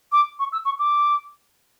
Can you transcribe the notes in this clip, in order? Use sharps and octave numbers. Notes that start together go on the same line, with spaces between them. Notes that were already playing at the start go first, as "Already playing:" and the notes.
D6
C#6
E6
C#6
D6